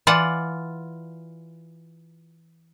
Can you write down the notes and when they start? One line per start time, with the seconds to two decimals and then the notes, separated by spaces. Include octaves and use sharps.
0.07 E3 F4 D5 F#5